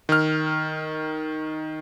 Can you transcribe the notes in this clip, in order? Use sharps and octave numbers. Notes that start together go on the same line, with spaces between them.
D#3 F6